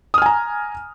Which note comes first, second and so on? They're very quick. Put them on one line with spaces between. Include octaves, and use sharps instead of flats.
D#6 F6 G#5 A#5